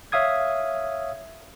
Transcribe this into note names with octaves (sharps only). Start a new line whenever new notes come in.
C#5 E5 F5 D#6 G#6